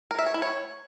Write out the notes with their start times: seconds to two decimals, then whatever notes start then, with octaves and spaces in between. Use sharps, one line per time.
0.11 A#4
0.19 E5
0.26 C#5
0.34 E4
0.42 C#5